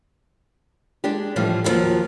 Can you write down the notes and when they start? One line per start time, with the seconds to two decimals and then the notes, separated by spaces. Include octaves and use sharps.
1.04 G#3 D4 G4
1.36 A2 E3 F3 G3
1.64 D#2 A#2 D3 F3 F#3